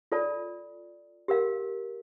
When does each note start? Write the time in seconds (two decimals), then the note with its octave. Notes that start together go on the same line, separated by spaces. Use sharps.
0.12 F4 A4 D5 A5
1.28 G4 A#4 F5